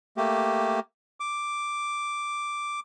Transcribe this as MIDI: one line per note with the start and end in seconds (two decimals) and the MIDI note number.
0.17 0.80 57
0.17 0.80 58
0.17 0.80 67
1.20 2.80 86